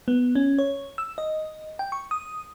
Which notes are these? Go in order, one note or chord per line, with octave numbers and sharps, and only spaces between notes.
B3
C#4
C#5
E6
D#5
G5
C#6
D#6